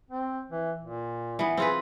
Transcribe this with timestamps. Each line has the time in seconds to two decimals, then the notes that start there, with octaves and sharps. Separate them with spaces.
0.11 C4
0.51 E3
0.82 A#2
1.39 E3 B3
1.57 C4 F4 G#4 B4